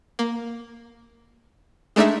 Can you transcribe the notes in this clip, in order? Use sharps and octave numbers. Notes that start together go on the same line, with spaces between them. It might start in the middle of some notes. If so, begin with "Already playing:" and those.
A#3
G#3 A3 D4 D#4 E5